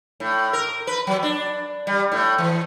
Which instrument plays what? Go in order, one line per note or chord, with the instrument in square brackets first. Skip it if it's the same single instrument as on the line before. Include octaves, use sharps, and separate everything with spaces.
[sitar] A2
A#4
B4
F#3
D4
G3
A2
E3